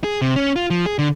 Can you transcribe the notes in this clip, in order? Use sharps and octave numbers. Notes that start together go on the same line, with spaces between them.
G#4
C3
C#4
F4
F3
G#4
D3